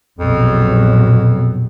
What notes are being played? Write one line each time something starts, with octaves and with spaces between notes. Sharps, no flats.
A#1 F2 B2 F#3